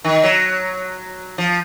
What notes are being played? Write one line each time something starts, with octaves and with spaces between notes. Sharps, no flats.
D#3
F#3
F3